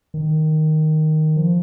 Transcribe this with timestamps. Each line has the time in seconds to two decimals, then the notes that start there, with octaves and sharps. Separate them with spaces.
0.14 D#3
1.36 F3